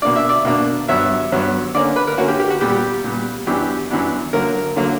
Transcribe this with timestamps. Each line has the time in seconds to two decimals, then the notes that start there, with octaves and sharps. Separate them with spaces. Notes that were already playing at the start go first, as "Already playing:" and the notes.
0.02 B2 A#3 D4 D5
0.16 E5
0.29 D5
0.45 B2 A#3 D4
0.88 G2 F#3 B3 E5
1.32 G2 F#3 B3
1.75 D3 A#3 C#4 D5
1.96 B4
2.07 A#4
2.18 D3 A#3 C#4 F#4
2.28 G4
2.40 G4
2.50 F#4
2.61 A#2 G3 B3 G4
3.04 A#2 G3 B3
3.47 F#2 E3 B3 D4 G4
3.90 F#2 E3 B3 D4
4.33 D3 F#3 A#3 A#4
4.76 D3 F#3 A#3